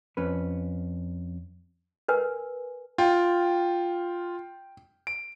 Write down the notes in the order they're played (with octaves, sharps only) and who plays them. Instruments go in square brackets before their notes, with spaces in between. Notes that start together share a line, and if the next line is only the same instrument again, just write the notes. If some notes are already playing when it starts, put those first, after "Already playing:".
[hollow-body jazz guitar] F2 C#4 B4
[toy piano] A#4 B4 G#5
[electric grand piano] F4 [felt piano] G5
[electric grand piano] D7